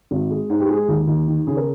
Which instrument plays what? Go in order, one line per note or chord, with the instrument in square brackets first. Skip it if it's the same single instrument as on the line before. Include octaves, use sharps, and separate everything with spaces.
[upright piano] G#1
G#3
G#2
G4
G#3 G#4
D#2
D#2
D#3
C#3 G#4
A#4